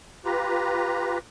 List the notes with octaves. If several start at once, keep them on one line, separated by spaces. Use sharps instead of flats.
F4 G4 B4 A#5